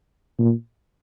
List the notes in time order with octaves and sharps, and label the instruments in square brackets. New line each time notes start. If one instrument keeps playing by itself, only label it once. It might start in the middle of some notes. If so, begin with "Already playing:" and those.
[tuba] A#2